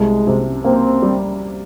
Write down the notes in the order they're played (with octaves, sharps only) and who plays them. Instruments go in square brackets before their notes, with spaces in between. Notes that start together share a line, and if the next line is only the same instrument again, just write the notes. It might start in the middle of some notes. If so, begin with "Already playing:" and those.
Already playing: [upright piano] C2 [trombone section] G#3
[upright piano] C3
[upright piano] A#3 [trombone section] C4
[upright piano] G3